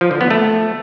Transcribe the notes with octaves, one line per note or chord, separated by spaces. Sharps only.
F3
D3
B3
A3